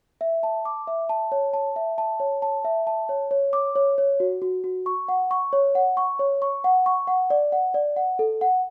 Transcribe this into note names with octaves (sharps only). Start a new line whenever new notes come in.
E5
A5
D6
E5
A5
C#5
A5
E5
A5
C#5
A5
E5
A5
C#5
C#5
D6
C#5
C#5
F#4
F#4
F#4
C#6
F#5
C#6
C#5
F#5
C#6
C#5
C#6
F#5
C#6
F#5
D5
F#5
D5
F#5
A4
F#5